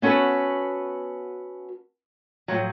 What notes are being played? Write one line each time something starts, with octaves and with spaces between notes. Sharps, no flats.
B3 C#4 F#4 A4 B4
A2 F3 F#3